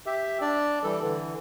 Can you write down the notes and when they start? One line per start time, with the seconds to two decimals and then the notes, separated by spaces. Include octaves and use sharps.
0.06 G4 E5
0.41 D4 D5
0.84 E3 G3 A4
1.02 D3 E3